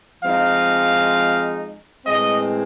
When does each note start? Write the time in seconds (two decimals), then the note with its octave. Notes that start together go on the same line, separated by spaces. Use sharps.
0.23 F3 G#3 C4 D#4 F5
2.05 A2 E3 G#3 C4 D#5